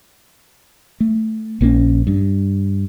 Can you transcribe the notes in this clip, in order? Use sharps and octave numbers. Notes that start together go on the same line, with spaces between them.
A3
A#1 A#3 C4 C#4
G2